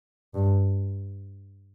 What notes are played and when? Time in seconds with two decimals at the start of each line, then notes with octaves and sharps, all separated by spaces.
0.35 G2